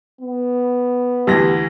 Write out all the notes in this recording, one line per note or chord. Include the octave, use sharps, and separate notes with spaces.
B3
D2 E3 G4 A#6